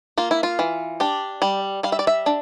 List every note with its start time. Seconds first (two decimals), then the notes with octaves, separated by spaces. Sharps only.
0.18 A#3 F4
0.31 E4
0.43 F4
0.59 E3
1.00 D4 G4
1.42 G3
1.83 G3 F5
1.92 E5
1.99 D5
2.07 E5
2.26 D4